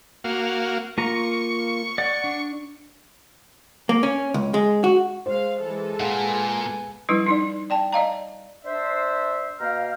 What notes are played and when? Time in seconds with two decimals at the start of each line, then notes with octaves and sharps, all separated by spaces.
0.24 A#3 F#4 F5
0.98 A#3 F4 A#5 C#6
1.98 D5 F#5
2.24 D4
3.89 A#3
4.03 C#4
4.34 C#2
4.54 G#3
4.84 F#4
5.26 G#3 C5 F5
5.61 E3 G#3 A4
6.00 A#2 B4 F5 F#5 G#5
7.09 F3 G3 D4 E4 B4
7.26 D4 D#4 D5
7.70 D5 G5 A5
7.92 D5 D#5 F5 A#5
8.65 D4 C5 E5
9.60 B2 A#3 F5 G5 A#5 F6